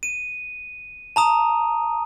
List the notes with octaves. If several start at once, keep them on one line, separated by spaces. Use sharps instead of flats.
D#7
A5 A#5 D#6